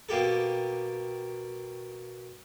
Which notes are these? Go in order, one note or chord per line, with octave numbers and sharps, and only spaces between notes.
B2 A#3 G4 A4